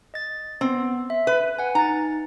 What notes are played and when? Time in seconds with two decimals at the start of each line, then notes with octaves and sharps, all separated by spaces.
0.14 D#5 A6
0.61 B3 C4
1.10 E5 B6
1.27 B4
1.59 F#5 G#5
1.75 D#4 A#5 A6